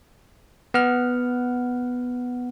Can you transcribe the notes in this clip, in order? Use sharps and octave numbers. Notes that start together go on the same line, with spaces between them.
B3 F#5 F6